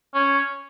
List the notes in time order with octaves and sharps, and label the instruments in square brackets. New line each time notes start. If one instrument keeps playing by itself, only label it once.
[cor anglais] C#4